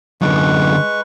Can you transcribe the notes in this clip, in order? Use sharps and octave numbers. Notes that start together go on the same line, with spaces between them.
F#2 D3 G#3 B4 C#6